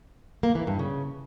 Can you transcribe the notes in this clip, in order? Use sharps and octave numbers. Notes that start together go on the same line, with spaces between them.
A#3
E3
G2
C#3